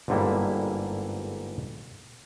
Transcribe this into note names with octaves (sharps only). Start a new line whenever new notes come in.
G1 G#2 D3 G3 A#3 E4